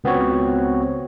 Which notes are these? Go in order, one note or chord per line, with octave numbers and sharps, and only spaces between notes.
C#2 B3 C4 F#4 C#5